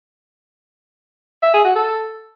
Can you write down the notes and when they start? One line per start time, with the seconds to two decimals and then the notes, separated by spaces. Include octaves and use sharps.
1.43 E5
1.54 G#4
1.65 F#4
1.76 A4